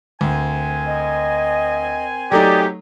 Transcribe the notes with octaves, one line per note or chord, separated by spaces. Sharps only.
D2 C4 A#4 G#5
D#5
F#3 A3 D#4 G4 D5 G5 D#6